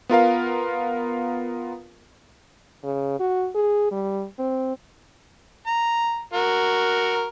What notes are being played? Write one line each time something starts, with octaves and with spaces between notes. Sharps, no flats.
B3 F4 A#4 F5
C#3
F#4
G#4
G3
C4
A#5
F#4 A#4